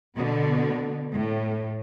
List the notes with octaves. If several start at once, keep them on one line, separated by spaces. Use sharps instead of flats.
B2 D3 B3
A2